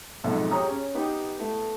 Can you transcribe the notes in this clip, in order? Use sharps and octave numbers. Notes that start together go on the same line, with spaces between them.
B1 F2 G#2 A4 E5 F#5
G4 G#4 C#5 A#5 D#6
C#4
B3 D#4 G4
A3 B3 E4